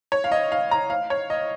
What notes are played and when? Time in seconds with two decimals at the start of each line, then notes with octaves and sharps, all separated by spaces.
0.12 C#5
0.24 F5
0.32 D#5
0.52 F5
0.71 A#5
0.90 F5
1.10 C#5
1.30 D#5